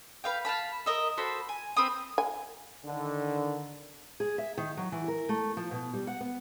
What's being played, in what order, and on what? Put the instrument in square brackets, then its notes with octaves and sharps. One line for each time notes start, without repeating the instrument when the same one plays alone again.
[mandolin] B4 F5 G5
F5 F#5 A5 B5
A#4 D#5 E5
F#4 A4 C5 B5
G#5
C4 B4 D#6
[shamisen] G#5
[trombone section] D3 D#3
[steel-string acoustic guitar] G#4
E5
D#3
F#3
E3
A#4
A3
F3
B2
G3
F#5
B3